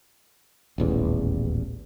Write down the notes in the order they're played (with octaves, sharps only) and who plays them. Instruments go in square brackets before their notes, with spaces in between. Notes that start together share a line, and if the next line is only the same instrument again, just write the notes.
[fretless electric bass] D#1 A1 E2